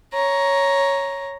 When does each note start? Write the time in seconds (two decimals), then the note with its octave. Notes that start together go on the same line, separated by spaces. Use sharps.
0.14 C#5 A#5